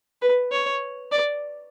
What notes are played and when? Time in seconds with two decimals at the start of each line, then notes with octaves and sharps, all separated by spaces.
0.21 B4
0.52 C#5
1.11 D5